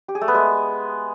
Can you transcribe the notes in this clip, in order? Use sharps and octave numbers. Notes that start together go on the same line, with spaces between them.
G4
G#4
A3
B3
G#3